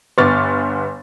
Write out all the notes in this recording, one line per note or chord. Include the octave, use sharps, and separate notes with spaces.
G1 B3 C#6 D6 F6 A6